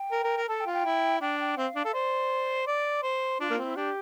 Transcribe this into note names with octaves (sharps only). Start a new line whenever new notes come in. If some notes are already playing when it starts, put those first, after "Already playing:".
Already playing: G5
A#4
A#4
A#4
A4 A5
G5
F4
G5
E4
D4 G5
G5
C4 F5
D4
A4
C5 D5
D5
C5
D4 F4
A#3 F4
C4
E4
D4 G4